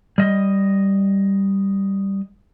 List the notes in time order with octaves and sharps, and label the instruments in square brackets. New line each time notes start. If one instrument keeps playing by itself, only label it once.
[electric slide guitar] G3 D#5